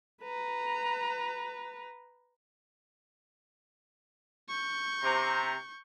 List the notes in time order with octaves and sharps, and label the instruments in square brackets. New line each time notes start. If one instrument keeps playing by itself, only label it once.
[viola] B4 A#5
[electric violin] C#6 G6
[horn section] C3 A#5